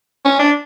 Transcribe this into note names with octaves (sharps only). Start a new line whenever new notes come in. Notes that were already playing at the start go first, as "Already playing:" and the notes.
C#4
D4